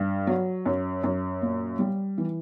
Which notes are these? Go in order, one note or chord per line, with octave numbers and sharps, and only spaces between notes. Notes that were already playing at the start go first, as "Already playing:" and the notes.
Already playing: G2
F#3
F#2
F#2
A#2
G3
E3